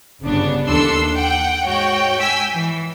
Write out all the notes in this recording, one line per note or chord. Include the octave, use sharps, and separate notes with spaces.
G1 C#3 B3 D4
D#2 E3 D4 A4 C6 E6
F#5 G5
G#2 F#4 C#5 G5
G5 G#5 E6 B6
E3